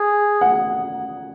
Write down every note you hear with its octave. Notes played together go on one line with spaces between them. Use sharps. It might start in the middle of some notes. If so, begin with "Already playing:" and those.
Already playing: G#4
F#5